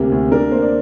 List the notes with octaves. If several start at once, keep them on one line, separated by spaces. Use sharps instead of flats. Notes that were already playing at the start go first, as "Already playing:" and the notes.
Already playing: D2 C3 A#3 G4
D2
D4 A#4
A#3 C5
D5